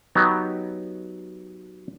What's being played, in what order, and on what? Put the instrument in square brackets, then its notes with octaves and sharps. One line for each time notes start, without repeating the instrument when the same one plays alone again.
[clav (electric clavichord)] F#3 B3 D#4 G4